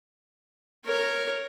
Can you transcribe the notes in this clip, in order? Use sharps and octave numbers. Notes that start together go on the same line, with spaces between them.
A#4 C#5